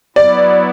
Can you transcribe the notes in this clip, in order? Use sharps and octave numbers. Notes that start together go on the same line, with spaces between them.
F#3 B3 E4 D5